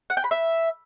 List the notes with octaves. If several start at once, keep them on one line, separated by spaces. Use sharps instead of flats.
F#5
G5
B5
E5